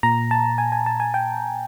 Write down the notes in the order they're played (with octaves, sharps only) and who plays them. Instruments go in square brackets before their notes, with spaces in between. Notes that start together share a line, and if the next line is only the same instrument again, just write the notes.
[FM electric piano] A#2 A#5
A5
G#5
G#5
A5
G#5
G5